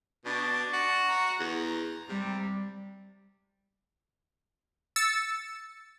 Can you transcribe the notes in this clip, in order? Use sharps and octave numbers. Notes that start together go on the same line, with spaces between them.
B2 D4 A5
F#4
A#5
E2
C3 G3
E6 A6 C#7